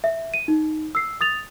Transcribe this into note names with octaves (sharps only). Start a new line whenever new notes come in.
E5
D#7
D#4
E6 C7
D#6 A6 F7